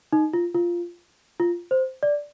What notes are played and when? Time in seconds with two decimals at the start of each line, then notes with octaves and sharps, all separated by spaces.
0.13 D#4
0.33 F4
0.54 F4
1.40 F4
1.71 C5
2.03 D5